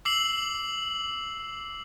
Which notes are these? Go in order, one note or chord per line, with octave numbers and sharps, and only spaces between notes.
D6 E6 C7 F#7